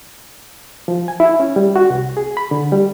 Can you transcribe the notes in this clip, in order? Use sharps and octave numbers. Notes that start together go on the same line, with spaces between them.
F3
G#5
E4
C#4
G3
F#4
C2
G#4
B5
D3
G3